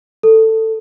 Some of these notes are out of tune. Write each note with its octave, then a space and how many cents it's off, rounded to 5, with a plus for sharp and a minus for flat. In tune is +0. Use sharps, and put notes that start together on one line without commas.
A4 +15